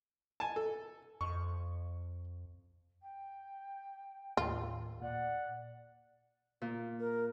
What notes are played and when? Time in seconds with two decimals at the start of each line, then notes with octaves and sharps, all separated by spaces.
0.40 G#5 A5
0.56 A4
1.21 F2 C#6
3.02 G5
4.37 D#2 A2 F4 A#4
5.02 A#2 D5 F#5
6.62 A#2
7.00 A#4